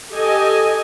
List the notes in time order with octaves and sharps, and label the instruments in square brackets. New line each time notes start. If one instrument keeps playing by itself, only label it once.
[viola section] G4 A4 D#5 G#5